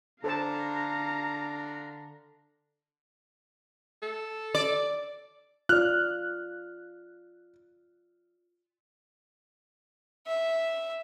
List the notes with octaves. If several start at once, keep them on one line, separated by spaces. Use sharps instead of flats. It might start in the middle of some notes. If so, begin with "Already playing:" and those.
D3 A4 C5 F5 A5 A#5
A4
D5
F4 D5 F6 F#6
E5